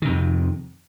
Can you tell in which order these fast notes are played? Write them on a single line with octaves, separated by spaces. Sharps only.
D#3 C3 F2